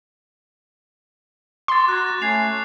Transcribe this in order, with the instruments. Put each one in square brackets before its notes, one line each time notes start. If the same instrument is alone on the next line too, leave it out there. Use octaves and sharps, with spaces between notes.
[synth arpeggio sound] C6 [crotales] D6 A6
[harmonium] F#4 A#5 [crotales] F#6 G#6
[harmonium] A3 C#4 [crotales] G#6 C7 F7